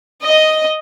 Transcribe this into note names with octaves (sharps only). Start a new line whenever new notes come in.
D#5